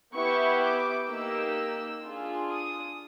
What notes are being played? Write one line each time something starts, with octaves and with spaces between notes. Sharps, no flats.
B3 E4 G4 C#6
D6
A#3 D#4 G4 E6
D4 F4 G#4
D#6